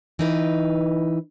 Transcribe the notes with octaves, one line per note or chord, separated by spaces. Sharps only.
E3 D#4 B4